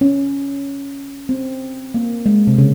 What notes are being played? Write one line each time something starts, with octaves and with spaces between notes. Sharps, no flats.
C#4
C4
A#3
G#3
C3
C#3